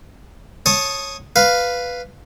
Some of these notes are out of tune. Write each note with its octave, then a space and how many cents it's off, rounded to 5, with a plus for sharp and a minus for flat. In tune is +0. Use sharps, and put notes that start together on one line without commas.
C#5 -15 A5 -5 D#6 +0
B4 +0 F5 +0